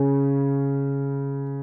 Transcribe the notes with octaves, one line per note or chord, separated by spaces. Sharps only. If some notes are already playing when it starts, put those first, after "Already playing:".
Already playing: C#3